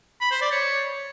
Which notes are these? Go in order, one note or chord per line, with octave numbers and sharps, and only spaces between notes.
B5
C5
D5
C#5